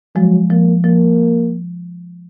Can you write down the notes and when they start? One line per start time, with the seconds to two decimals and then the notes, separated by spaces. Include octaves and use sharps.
0.15 F3 F#3 G#3
0.50 F3 A#3
0.84 F3 A#3